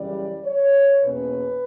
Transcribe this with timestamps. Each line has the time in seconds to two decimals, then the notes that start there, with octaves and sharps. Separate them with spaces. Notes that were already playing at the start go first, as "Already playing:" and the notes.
Already playing: F#2 C#3 E3 G3 D5
0.45 C#5
1.03 E2 B2 A#3 C#4 B4